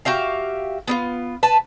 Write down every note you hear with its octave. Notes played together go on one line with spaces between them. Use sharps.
F#4 G4 E5 F5
B3 E4 F4
B4 A5